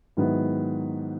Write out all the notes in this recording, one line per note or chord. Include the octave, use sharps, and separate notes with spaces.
G#2 D#3 F#3 B3 E4